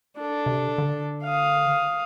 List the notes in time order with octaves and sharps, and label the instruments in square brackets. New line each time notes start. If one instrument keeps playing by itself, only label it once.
[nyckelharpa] D4 A4
[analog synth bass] C3
D3
[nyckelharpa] F5 D#6